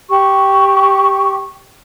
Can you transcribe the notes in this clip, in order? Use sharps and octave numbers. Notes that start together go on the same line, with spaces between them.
G4 C#6